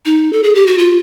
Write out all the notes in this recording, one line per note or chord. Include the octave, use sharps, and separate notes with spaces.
D#4
A4
G#4
G4
F#4
F4